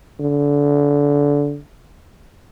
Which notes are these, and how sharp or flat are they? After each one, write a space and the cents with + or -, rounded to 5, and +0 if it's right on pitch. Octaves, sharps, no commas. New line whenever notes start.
D3 -25